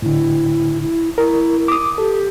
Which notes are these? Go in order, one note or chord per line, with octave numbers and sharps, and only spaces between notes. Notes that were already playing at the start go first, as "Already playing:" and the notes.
A2 D3 E4
E4
E4 A#4
D6 D#6
G4 A4